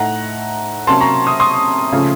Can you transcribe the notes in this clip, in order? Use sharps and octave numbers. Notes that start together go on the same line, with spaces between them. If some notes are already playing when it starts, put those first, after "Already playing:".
Already playing: A2 A3 D#4 F#5 A#5
C3 F#3 A#3 C#4 A5 C6
A#5 C#6
C6 D#6
C6 D#6
C#3 F3 A3 C#4